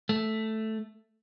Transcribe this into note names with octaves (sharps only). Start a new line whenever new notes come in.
A3